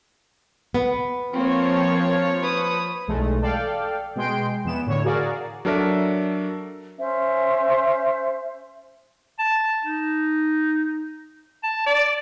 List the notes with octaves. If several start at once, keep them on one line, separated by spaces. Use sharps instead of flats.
B3
F3 A#3 C4 C#5
B4 D#6
B1 E2 G#3 A3
A4 D5 F5 G5
B2 G#3 G5 C6 D7
E2 E3 B3 E7
A2 D3 C#5
F#4 G#4 A#4 D5 F5
F#3 D4 A4 A#4 D5 E5
C#4 C5 E5
A5
D#4
A5
D5